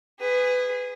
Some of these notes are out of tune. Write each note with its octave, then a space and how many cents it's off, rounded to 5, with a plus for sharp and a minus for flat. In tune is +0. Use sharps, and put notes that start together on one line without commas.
G#4 -20 B4 +20